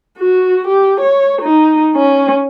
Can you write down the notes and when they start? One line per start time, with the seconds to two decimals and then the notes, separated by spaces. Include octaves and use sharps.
0.19 F#4
0.68 G4
1.01 C#5
1.42 D#4
1.96 C#4